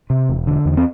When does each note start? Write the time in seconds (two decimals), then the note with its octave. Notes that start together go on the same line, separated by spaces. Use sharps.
0.10 C3
0.29 E1
0.47 D3
0.65 E2
0.77 C4